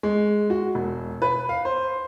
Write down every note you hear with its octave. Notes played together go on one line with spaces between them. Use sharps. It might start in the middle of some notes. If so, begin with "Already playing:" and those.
G#3
F#4
E1
B4
F5
C5